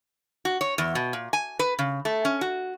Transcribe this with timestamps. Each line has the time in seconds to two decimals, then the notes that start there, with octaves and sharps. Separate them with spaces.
0.45 F#4
0.61 C#5
0.78 E2
0.95 B2
1.13 A#2
1.33 G#5
1.59 B4
1.79 C#3
2.05 A3
2.25 C#4
2.41 F#4